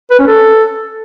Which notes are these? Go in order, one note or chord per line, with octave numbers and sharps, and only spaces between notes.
B4
C#4
A4